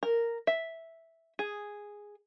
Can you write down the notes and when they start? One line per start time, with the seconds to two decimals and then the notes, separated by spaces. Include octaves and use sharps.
0.03 A#4
0.47 E5
1.39 G#4